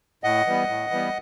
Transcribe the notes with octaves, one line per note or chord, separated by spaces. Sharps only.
A2 D#5 F#5
E3 G3 B3
A2
E3 G3 B3